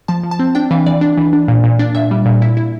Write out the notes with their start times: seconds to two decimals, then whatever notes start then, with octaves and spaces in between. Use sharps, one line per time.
0.08 F3 A5
0.24 F3
0.31 A5
0.39 C4
0.55 D4 G5
0.71 E3 F5
0.86 E3 D5
1.01 D4
1.17 E3
1.33 D4
1.48 A#2
1.64 A#2
1.79 D4
1.95 A#2 E5
2.11 G3
2.26 A#2
2.42 E4
2.57 E4